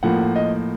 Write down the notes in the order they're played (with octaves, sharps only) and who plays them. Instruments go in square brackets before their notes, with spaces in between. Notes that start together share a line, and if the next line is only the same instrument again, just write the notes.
[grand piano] A2 F3 A#3 F#5
D#5